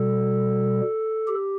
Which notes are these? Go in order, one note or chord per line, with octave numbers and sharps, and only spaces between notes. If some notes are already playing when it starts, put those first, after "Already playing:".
Already playing: B2 G3 A4
G4